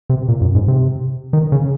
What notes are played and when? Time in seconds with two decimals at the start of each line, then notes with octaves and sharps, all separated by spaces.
0.10 C3
0.28 A#2
0.41 F#2
0.55 G#2
0.68 C3
1.33 D#3
1.52 C#3